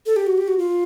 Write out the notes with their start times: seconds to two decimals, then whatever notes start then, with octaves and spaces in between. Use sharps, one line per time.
0.06 A4
0.16 G4
0.27 F#4
0.38 G4
0.48 F#4
0.58 F4